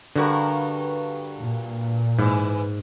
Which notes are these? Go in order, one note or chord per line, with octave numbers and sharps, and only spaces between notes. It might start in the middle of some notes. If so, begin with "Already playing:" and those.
G2 D3 F#4 A#4
A#2
G#2 E3 E4